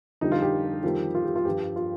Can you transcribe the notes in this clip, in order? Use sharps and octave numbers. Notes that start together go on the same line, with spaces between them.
F2 D3 G3 D#4
F4
G4
F2 D#3 G3
F4
G4
F4
G2 F3 G4
F4